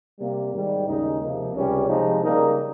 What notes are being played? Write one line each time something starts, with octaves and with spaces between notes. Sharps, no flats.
C3 G3 A#3
G#2 D#3 G3
D#2 C#3 G#3 D#4
C3 F3 A#3
C#2 C3 G3 C#4 G4
C3 F3 G#3 C4 D#4
C#3 G3 A#3 D#4 A#4